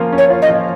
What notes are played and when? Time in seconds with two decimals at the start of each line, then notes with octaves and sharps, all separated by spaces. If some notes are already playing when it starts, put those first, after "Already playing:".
Already playing: F3 A#3 C#4 F4
0.13 C#4
0.18 C#5
0.30 F4
0.42 D#5
0.48 F3